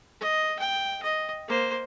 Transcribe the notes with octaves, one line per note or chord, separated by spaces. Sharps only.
D#5
G5
D#5
A#3 C5